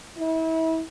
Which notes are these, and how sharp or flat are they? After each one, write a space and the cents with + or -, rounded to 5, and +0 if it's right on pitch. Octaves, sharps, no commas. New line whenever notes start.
E4 -35